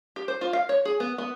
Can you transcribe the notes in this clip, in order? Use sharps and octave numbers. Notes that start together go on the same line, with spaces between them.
G4
C5
F4
F5
C#5
G#4
B3
B3